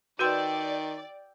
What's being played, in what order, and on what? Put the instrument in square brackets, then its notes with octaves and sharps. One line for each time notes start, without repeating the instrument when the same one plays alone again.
[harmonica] D#3 [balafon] F#4 B4 C6 [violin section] D5 [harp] G5 E6 G6